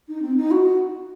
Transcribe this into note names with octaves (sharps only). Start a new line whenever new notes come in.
D#4
C4
D#4
F#4